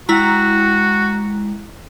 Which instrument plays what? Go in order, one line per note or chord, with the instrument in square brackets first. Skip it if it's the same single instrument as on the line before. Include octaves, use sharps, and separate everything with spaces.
[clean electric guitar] G#3 G5 [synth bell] E4 A#5 [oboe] F#4